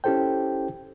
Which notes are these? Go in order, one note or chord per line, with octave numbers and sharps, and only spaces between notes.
C#4 E4 G4 A4 C5 G5